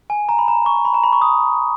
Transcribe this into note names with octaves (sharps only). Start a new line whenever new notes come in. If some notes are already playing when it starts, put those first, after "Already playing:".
G#5
A#5
B5
A#5
C#6
B5
A#5
B5
C#6
D#6